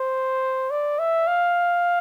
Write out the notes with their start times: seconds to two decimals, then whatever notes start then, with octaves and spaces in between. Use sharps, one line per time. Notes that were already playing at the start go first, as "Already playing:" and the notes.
Already playing: C5
0.71 D5
0.99 E5
1.27 F5